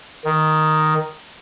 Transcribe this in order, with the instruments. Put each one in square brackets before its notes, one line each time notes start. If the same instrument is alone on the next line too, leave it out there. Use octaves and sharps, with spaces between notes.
[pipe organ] D#3